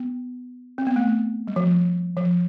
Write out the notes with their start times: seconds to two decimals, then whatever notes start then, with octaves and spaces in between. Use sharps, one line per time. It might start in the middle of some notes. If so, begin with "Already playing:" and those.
Already playing: B3
0.78 C4
0.87 B3
0.96 A3
1.47 G3
1.56 F3
2.17 F3